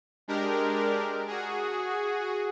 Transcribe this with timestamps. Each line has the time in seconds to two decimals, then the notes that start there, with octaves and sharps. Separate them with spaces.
0.28 G#3 D4 G4 A#4
1.28 F#4 G#4